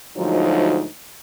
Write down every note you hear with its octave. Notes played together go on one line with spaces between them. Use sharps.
D2 G#2 F3 F#3 D#4